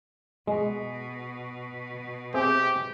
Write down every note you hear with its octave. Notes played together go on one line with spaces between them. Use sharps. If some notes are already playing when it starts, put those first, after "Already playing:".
B2 G#3
C4 G4 G#4 E5